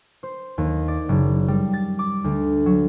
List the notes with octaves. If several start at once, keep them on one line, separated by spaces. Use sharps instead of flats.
C5
D#2
D5
F#1
G3
A6
D6
D2
F#3